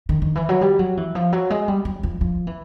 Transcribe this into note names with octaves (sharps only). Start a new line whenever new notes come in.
D#3
D#3
E3
F#3
G3
F#3
E3
F3
F#3
G#3
G3
F#3
F3
F3
E3